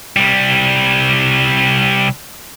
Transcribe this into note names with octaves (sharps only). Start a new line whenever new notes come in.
C2 G3